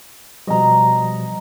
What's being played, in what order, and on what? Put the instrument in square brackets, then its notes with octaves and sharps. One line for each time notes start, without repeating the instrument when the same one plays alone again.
[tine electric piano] B2 F3 G3 [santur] D#5 A#5